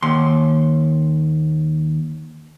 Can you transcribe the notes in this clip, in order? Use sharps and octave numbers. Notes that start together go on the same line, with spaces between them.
D#2 C6